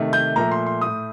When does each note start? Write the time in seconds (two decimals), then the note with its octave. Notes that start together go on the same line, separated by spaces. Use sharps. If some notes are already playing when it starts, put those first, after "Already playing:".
Already playing: C3 D#3 A3
0.13 G6
0.36 A#2 F3 A3 A#5
0.51 C6
0.67 C6
0.81 A2 A3 D#6